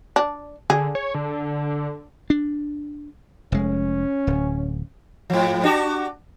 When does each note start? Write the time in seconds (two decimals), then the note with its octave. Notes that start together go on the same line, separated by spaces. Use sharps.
0.16 D4
0.70 D3 G#4
0.95 C#5
1.14 D3
2.30 D4
3.52 F1 G#3 C#4
4.27 D1
5.30 G#2 F3
5.64 D4 F#4 G4